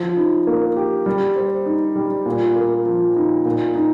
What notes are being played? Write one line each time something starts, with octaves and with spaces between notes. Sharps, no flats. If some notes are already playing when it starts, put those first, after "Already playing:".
Already playing: F3
D#4
A#3
G4
G3
C5
D#4
G3
A#2
A#3
F3
D#4
A#2
D#4